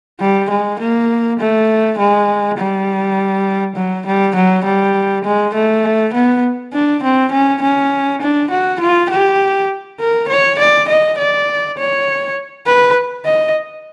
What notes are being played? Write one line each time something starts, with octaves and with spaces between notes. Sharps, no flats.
G3
G#3
A#3
A3
G#3
G3
F#3
G3
F#3
G3
G#3
A3
B3
D4
C4
C#4
C#4
D4
F#4
F4
G4
A#4
C#5
D5
D#5
D5
C#5
B4
D#5